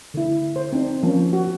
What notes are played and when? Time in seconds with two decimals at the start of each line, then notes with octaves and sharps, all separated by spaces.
0.14 D3 E4
0.56 C5
0.72 C4 D4 D#4
1.03 F3 A#3 C#4
1.33 F#4